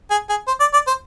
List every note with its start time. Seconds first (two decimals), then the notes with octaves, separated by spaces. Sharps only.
0.11 G#4
0.29 G#4
0.47 C5
0.60 D5
0.73 D5
0.87 C5